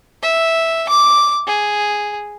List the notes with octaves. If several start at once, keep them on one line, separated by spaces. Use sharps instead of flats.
E5
D6
G#4